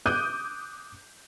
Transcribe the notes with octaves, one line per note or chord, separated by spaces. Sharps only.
D6 D#6 F#6 G6 D#7